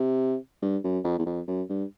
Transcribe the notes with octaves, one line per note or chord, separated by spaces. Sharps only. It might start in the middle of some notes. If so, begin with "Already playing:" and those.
Already playing: C3
G2
F#2
F2
E2
F2
F#2
G2